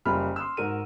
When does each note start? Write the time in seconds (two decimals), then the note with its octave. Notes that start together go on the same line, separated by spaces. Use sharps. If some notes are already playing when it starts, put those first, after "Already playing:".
0.05 F#1 G3 F4 B5 F6
0.36 C6 D#6 E6
0.57 G#2 F#4 A#4 D#7